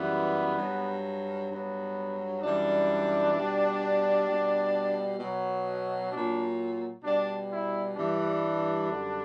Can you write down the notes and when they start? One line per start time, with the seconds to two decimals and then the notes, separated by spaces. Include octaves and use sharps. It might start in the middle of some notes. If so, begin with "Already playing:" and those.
Already playing: F#2 E3 G3 B3
0.57 G2 F#3
1.49 G2 F#3 B3
2.42 F#2 E3 G3 D4
3.34 B2 G3
4.27 B2 G3
5.19 B2 F#3
6.11 A#2 F#3 D4
7.03 B2 G3 D4
7.50 E4
7.96 G2 E3 G3 D4
8.88 F#2 D3 G3